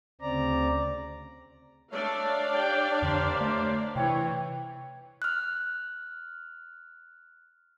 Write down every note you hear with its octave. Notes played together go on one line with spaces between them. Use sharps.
D2 C#3 C4 D5 A#5
A3 D4 C#5 D5 F5
G4 G5
F2 D3 A#3 G4 C5
A3
C3 E3 C#5 G5
F6 F#6